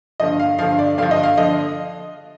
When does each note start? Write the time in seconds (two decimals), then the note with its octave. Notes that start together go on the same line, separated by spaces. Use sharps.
0.20 G2 D3 F3 D#5
0.39 F5
0.59 G2 D3 F3 F5
0.79 D5
0.98 G2 D3 F3 F5
1.11 D#5
1.23 F5
1.37 D3 F3 D#5